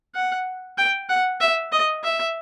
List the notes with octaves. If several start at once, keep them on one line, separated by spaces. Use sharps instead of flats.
F#5
G5
F#5
E5
D#5
E5